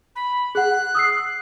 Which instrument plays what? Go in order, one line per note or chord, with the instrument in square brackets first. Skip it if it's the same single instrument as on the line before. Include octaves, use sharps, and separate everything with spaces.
[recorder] B5
[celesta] G#4 F#5 [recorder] F#6
[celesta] D#6 E6 C7